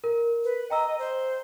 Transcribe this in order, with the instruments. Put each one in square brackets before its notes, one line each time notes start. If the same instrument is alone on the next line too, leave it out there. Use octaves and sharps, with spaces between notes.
[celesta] A#4
[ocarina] B4
[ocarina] D#5 [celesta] G5 A#5 E6
[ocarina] C5